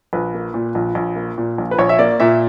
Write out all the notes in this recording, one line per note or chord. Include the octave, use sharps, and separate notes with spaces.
A#1 B4
A#3
A#2
A#1
A#1
A#3
A#2
A#1
B4
A#1 C#5
E5
A#3 D5
A#2 E5